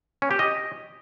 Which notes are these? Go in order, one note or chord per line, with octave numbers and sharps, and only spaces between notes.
C#4
G4
D#5